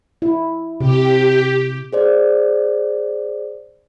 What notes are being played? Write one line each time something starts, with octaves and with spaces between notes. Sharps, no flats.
E4
C3 G4
G#4 C5 D5